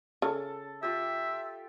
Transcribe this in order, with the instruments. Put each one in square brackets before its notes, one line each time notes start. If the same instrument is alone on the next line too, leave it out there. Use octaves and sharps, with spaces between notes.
[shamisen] C#3 [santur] A4
[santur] F4 G4 [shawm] E5